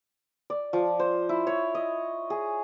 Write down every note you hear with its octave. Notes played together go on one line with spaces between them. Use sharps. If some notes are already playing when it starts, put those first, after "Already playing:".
D5
F3
C5
E4
C#5
D#5
G#4